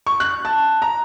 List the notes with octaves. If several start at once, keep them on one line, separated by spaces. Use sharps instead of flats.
C#6
F#6
A5
A#5